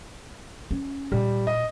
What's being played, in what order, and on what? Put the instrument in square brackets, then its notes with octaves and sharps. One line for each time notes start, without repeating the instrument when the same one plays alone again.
[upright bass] C#4
[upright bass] A#2 [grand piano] G3
[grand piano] D#5